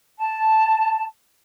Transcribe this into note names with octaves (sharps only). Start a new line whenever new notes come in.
A5